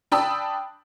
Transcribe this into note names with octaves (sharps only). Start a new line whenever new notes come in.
D4 G5 A5 B5 D#6 E6